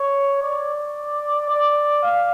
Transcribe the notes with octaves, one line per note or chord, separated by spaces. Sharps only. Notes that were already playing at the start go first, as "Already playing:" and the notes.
Already playing: C#5
D5
D5
F5